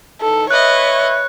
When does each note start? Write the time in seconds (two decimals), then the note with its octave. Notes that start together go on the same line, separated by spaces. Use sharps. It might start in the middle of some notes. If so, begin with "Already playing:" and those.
0.21 E3 D#4 A4
0.51 B4 C#5 D#5 E5 F#6